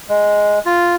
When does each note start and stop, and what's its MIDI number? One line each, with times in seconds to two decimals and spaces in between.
0.09 0.59 56
0.66 0.96 65